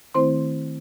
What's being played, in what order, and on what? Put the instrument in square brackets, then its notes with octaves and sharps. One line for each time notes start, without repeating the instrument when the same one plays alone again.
[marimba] D#3 A3 C4 E4 C5 C6